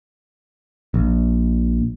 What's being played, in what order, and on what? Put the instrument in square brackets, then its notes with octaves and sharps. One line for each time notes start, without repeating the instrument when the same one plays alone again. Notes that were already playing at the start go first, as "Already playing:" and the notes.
[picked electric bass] A#1